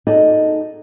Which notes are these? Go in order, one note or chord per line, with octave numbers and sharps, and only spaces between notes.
D#4 F#4 G#4 A4 D5